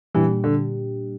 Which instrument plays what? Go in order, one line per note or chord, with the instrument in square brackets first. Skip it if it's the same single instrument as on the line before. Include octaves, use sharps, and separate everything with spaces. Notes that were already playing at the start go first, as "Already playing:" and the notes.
[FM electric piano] A#2 G3 D4 G4 [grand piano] E3
[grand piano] D3